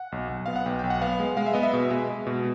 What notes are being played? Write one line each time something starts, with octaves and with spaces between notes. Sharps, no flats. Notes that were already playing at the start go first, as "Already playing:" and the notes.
Already playing: F#5
B1
B1
B3 F5
F#5
B1 G5
B1 G5
F#5
B3 F5
G#3
G#3 F5
E5
B3 D#5
E5
B2
G#3
G#3
B2